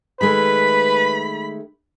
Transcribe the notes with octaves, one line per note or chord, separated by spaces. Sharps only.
D#3 G#3 A3 B4 B5